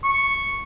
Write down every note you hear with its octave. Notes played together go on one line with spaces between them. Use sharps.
C#6